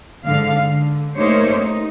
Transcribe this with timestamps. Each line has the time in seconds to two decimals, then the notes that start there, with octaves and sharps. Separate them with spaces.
0.25 G#2 D3 F5
0.67 D3
1.17 A3 A#3 D#4 G4 C5 C#5
1.57 D#4